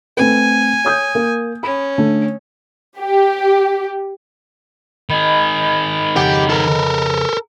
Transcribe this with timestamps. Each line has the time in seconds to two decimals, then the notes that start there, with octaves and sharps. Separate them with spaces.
0.17 A3 C4 B4 G#5
0.85 C#5 D#6 G6
1.15 A#3
1.63 C#4 B5
1.98 D3 A3
2.99 G4
5.10 D#3 G#4 D#5 B5
6.16 F2 C#3 G4 F#5
6.50 A4 A#4